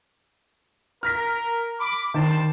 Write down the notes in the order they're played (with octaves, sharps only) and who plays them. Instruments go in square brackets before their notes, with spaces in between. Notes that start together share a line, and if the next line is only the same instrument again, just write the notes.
[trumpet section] A#4 [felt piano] F6 A#6 B6
[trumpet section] B5 D6
[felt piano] D#3 [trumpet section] G3 C5 A5